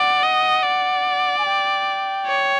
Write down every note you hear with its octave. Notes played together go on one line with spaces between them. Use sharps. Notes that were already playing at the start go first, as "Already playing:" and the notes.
Already playing: D5 F#5
D#5
D5
G#5
G5
C#5